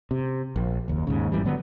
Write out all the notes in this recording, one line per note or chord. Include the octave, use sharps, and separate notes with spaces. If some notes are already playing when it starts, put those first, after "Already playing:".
C3
A#1
F#1 D#2
D#2 G#2 C#3
G#1 G#2 E3 G3
D3 F#3 B3